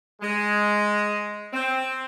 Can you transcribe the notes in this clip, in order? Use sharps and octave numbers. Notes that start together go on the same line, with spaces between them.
G#3
C4